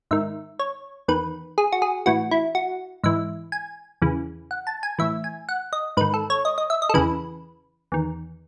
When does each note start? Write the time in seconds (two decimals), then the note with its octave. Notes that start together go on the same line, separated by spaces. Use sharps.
0.11 G#2 D#3 E5
0.59 C#5
1.08 E2 D#3 B4
1.58 G#4
1.72 F#4
1.82 G#4
2.06 A2 E3 F#4
2.31 E4
2.55 F#4
3.03 G#2 E3 E5
3.52 G#5
4.02 E2 C#3 E3
4.51 F#5
4.67 A5
4.83 G#5
4.99 A2 E3 E5
5.24 G#5
5.49 F#5
5.73 D#5
5.97 G#2 D#3 B4
6.14 A4
6.30 C#5
6.45 D#5
6.58 D#5
6.70 E5
6.82 D#5
6.89 A4
6.94 E2 C#3 E3 B4
7.92 E2 D#3